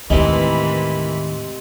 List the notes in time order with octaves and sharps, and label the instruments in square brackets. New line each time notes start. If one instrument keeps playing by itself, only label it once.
[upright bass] D#2 A2 [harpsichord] C3 G#3 [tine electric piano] D#3 [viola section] E3 A#4 B5